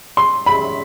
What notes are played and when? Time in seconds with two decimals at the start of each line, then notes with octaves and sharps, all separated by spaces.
0.17 C6
0.46 B5